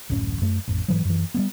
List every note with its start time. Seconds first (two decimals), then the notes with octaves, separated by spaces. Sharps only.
0.09 D1 A1 F#2 C#4
0.42 F#2 A3
0.68 A1 F2
0.88 G#2 E3 F#3
1.05 F#2 E3
1.34 G3 A3 B3